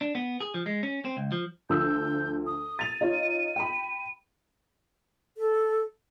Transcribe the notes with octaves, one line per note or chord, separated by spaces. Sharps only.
D4
B3
G#4
F3
G#3
C#4
C4
C#2
F3
D2 F3 E6 G6
D#6
A6 D#7 F7
D#4 F4 C#5
G5 B5
A4